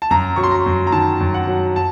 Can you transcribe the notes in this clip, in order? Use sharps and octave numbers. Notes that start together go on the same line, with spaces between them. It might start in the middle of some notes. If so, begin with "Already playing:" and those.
A5
F#2 A#5
F#3 C#6
C6
A#5
F#2
A#5
D#3 A5
F#2
F#5
F#3
A5